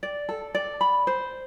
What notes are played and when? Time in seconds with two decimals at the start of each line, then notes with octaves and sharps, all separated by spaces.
0.03 D5
0.29 A4
0.55 D5
0.81 B5
1.07 C5